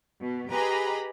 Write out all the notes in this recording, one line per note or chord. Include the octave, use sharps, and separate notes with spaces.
B2
G4 G#4 B4 D#5 A#5 B5